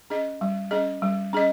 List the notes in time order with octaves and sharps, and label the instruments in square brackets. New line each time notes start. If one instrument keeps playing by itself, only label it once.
[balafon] C#4 G#4 D#5
G3
C#4 G#4 D#5
G3
C#4 G#4 D#5